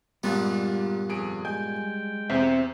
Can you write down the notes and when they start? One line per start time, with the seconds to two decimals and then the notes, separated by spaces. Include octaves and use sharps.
0.23 G2 A#2 G3 G#3 A#3 B3 F4
1.09 F2 G#4 D7
1.45 G#3 G5 G#5 G6
2.30 E2 C4 C5 E5